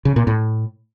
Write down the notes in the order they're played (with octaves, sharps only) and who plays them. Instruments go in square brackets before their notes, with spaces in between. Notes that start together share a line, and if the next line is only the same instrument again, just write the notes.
[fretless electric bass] C#3
A#2
A2